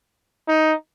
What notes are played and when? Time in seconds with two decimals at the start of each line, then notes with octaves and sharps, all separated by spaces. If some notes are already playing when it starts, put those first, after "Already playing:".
0.48 D#4